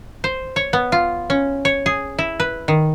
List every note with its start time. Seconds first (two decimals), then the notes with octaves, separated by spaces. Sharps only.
0.24 C5
0.56 C#5
0.73 B3
0.92 F4
1.30 C#4
1.65 C#5
1.86 G#4
2.19 E4
2.40 B4
2.68 D#3